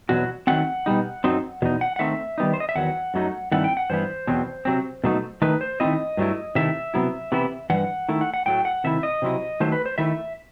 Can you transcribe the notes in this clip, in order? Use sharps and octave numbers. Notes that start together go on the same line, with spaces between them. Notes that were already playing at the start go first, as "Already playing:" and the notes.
E2 B2 F#3 F#4
D#3 F#3 A3 C4 F#5
B2 G3 D#4
F#2 F#3 C4 D#4
E2 B2 D#4
F#5
F#5
D#3 A3 C4 E5
D#3 G3 B3 D#4
C5
D#5
E5
E2 D#3 F#3 F#5
F#2 F#3 A3 D#4
G2 D#3 A3 C4 E4 F#5
G5
F#5
G2 E3 B3 E4 C5
E2 B2 F#3 C4
C3 F#3 C4
B2 F#3 A3 D#4
D#3 A3 D#4 B4
C5
D#3 A3 C4 E4 D#5
G2 F#3 A3 E4
C3 D#3 A3 E4 E5
C3 F#3 B3 E4
C3 E3 B3 E4
G2 E3 F#5
D#3 A3 E4
F#5
F#5
A2 F#3 A3 G5
F#5
C3 D#3 A3 E4 E5
D#5
C3 F#3 C4 E4
D#3 F#3 A3 C5
B4
C5
D#3 A3 E4 E5